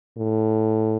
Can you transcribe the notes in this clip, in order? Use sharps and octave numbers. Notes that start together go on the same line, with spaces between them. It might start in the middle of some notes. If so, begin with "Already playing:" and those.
A2